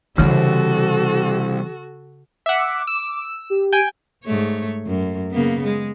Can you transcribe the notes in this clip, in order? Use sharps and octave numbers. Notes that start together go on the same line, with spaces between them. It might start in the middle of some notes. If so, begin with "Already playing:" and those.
C2 C#3 E3 D4 F#4 A4
E5 F#5 D6
E6
G4
G5 G#5
G#2 A3 C#5
F#2
C#3 A#3 B3
G#3